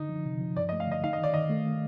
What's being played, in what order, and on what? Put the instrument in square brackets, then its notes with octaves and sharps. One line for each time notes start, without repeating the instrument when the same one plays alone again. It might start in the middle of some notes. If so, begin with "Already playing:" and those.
Already playing: [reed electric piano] D3 [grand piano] D#4
[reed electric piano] F3
C3
F3
[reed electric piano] G2 [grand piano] D5
[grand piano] D#5
[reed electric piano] A3
[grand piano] F5
[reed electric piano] D3 [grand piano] D#5
[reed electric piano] D#4 [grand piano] F5
[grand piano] D#5
[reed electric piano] D#3 [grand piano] D5
[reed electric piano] D#3 [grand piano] D#5
[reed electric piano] A3
D#3